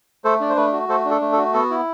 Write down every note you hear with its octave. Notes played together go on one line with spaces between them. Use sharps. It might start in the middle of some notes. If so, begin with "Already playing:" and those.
A3 A4 C5
D4 D5
C5
A3 B4
F#4
A3 A4 C5
D4
A4
A3
A4
F#4
B3 A4
E4